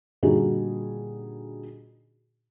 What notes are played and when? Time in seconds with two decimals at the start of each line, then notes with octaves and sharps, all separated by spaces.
0.23 A#2 D3 G3 D#4 F#4 G#4